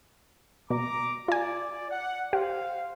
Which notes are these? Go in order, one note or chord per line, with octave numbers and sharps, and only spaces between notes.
B2 A#5 D6
F4 D5 G#5
F#5
G4 C5 F5